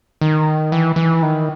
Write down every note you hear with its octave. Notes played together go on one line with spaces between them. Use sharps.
D#3
E3
E3
D#3